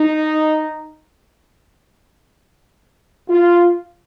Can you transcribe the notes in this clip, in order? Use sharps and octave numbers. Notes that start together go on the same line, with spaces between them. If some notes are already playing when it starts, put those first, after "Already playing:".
Already playing: D#4
F4